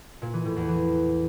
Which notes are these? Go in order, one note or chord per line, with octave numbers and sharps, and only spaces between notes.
A#2
E3
A2
E2
E3